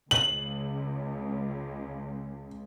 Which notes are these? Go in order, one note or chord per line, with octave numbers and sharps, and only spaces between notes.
C#2 F#7